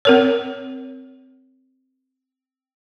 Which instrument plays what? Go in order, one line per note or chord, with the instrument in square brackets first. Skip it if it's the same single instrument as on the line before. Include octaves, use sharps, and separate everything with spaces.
[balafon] C4 A#4 C#5